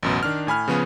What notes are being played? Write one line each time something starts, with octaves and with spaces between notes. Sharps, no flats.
A1 F#2 B2
D#3 D4 F6
A2 G#5 B5 F6
C#3 F3 B3 C#4 G#4